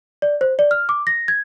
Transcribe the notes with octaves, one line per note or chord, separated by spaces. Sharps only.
D5
C5
D5
F6
D6
A#6
G#6